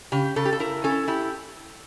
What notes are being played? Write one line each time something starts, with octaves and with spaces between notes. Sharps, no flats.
C#3 G4
C#3 A4
G4
A4
E4 A#4
C#4 A4
E4 G4